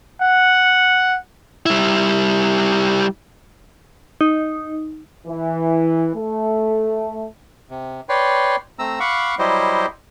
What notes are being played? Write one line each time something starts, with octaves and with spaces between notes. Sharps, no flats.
F#5
G3 E4
D#4
E3
A3
C3
B4 C#5 D5 G5 C6
A3 C4 A#5 E6
F5 F#5 B5 C#6 D6
F#3 G3 E4 G4 C5 D#5